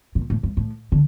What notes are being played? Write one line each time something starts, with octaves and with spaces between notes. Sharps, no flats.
A#2
A2
G2
A2
D3